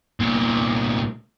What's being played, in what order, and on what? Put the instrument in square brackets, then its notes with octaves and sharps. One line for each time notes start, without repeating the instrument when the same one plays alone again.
[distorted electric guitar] C2 A#2